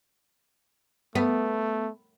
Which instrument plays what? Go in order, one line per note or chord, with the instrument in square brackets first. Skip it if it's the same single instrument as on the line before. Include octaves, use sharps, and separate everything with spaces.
[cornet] A3 [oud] B3